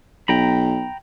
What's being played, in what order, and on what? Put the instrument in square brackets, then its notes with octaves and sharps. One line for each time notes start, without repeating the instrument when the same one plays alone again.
[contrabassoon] B1 [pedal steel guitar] G5 A#5 B5